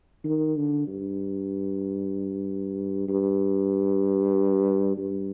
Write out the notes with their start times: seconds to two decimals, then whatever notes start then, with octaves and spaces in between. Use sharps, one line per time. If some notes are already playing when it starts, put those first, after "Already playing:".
0.25 D#3
0.57 D3
0.87 G2
3.08 G2
4.98 G2